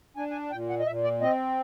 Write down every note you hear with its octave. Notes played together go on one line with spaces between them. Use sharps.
D4 G#5
G#5
A#2 G5
F#5
D#5
A#2 E5
D5
C4 D#5